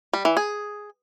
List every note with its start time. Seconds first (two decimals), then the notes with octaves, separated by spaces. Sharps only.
0.13 G3
0.25 E3
0.37 G#4